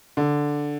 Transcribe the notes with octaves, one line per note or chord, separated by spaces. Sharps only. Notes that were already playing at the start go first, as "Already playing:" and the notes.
D3